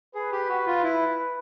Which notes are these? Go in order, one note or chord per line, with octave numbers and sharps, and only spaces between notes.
G#4 B4
G4
F#4
F4
E4